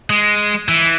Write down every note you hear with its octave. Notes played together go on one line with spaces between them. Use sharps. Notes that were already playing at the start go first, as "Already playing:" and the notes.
G#3
E3